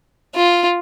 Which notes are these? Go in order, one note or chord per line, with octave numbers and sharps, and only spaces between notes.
F4